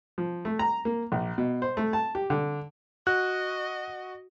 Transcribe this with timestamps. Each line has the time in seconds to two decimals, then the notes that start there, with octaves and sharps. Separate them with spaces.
0.18 F3
0.45 A3
0.59 A#5
0.85 A#3
1.12 A#1
1.38 B2
1.62 C5
1.77 A3
1.93 A5
2.15 G4
2.30 D3
3.07 F#4 D#5 F#6